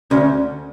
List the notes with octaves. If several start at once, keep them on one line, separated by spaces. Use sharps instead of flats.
D2 C#4